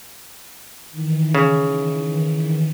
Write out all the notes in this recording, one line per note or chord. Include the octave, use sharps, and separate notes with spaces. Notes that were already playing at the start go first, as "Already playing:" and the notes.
D#3 E3
C#3